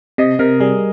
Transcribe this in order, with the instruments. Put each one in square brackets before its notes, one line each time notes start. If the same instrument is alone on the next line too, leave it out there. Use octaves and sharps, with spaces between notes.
[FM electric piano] C3 [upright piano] D#5
[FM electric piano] C3 [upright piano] A#4
[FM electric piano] G3 [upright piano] G#4